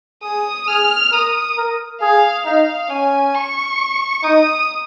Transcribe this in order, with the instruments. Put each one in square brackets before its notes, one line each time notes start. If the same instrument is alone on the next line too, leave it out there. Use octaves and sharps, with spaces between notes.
[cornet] G#4 [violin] D#6
[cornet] G#4 [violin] F6
[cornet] A#4 [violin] D#6
[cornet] A#4
[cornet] G#4 [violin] F5
[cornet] D#4 [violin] F5
[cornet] C#4 [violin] G#5
[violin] C#6
[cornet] D#4 [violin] D#6